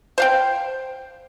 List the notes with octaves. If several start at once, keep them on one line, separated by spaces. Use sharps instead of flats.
C5 F5 G5